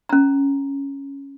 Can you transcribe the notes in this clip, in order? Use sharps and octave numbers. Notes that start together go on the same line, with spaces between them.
C#4 A#5